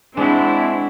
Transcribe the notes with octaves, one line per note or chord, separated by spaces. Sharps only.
G#3 C4 D4 E4 F#4